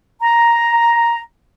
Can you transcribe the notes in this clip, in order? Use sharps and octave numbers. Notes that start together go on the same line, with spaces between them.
A#5